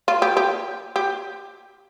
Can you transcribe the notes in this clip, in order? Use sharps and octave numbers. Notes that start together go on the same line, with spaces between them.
F4
G4
G4
G4